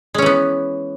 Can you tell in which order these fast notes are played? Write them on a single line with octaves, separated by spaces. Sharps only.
G#3 C#4 E3 B3